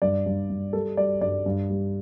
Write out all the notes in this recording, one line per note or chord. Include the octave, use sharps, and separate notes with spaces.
G2 D5
G2
G2
G3 A4
G3 D5
G2 D5
G2
G3